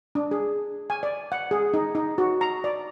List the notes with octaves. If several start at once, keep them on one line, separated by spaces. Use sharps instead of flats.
D4
G#4
G#5
D5
F#5
G#4
D#4
D#4
F#4
A#5
D5